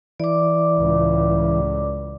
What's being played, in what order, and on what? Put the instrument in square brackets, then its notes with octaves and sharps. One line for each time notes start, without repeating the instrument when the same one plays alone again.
[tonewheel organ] E3 [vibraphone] D5 D6
[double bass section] C#2 A2